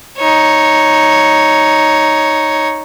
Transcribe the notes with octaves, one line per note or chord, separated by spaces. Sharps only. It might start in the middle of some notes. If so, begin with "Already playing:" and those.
D#4 C#5